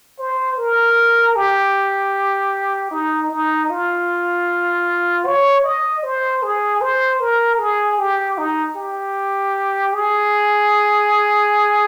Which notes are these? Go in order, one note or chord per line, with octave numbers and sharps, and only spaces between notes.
C5
A#4
G4
D#4
D#4
F4
C#5
D#5
C5
G#4
C5
A#4
G#4
G4
D#4
G4
G#4